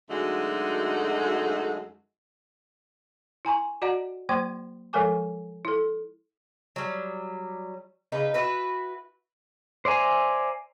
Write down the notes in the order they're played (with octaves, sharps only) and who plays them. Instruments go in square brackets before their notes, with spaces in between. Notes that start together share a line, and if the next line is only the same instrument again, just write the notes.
[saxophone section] F#2 D3 G#3 A3 D#4 F#4
[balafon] E4 G#5 A#5 C#6
F#4 D5 D#5 F#5 A#5
F#3 A#3 C5 G5 C6 C#6
F3 G#3 A4 A#4 G#5 D6
E4 A4
[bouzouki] F#3 G3
C#3 D#4 B4
E4 F#4 B4
[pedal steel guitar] C5 D5 E5 G#5 A#5